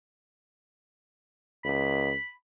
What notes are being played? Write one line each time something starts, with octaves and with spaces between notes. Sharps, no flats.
C#2 B5